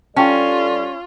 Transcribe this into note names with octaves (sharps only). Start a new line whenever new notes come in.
G3 C#4 F4 A4 D5 G5 A5